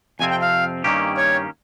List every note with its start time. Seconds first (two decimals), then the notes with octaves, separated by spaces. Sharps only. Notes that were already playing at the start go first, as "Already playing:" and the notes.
0.19 F2 C3 F3 C4 G#5
0.31 G5
0.42 F5
0.84 G2 D#3 A#3 C#4 G4
1.17 C#5